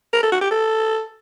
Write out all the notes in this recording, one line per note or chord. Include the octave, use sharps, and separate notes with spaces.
A#4
A4
F#4
G4
A4